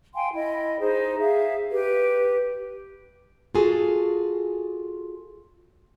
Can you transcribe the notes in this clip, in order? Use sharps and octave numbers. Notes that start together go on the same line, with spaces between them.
F5 G5 G#5 C6
E4 D#5 B5
D#4 G#4 C5
G#4 E5 F5
G4 B4
F4 F#4 G#4 A4